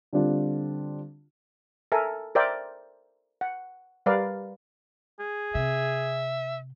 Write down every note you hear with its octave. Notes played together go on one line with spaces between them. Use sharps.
D3 G3 C4 D4 F4
A4 A#4 E5 G#5
A#4 C5 D5 E5 G5
F#5
G3 A#4 B4 D5 F5
G#4
C3 E5